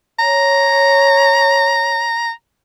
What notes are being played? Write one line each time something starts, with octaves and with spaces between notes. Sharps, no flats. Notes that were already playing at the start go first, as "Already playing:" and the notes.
C#5 A#5